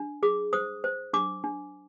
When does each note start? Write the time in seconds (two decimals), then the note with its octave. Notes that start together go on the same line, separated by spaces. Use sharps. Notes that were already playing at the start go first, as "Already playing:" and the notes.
Already playing: D4
0.23 G#4 D6
0.53 C5 D#6
0.84 C5
1.13 D4 D6
1.44 D4